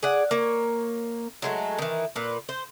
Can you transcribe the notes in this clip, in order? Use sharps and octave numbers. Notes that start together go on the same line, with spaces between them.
G#4 D5 F#5
A#3 C#5
F#3 G#3 A3
D#3 E3
A#2 B4
C5